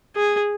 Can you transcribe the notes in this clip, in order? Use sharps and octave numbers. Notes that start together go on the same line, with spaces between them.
G#4